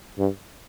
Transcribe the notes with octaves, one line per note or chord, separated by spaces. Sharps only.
G2